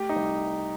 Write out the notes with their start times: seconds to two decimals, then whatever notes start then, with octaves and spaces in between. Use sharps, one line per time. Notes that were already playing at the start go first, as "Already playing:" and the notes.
Already playing: A3 G4
0.09 D#4
0.16 C2